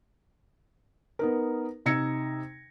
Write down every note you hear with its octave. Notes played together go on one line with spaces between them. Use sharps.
B3 D#4 A#4
C3 D#4 E6 G#6 A#6 C#7